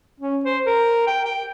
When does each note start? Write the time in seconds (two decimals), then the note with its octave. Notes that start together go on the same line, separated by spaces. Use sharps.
0.20 C#4
0.45 C5
0.66 A#4
1.07 G5
1.25 G5